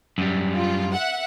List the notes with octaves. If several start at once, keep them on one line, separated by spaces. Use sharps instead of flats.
F#2 G3
F4
E5 F#5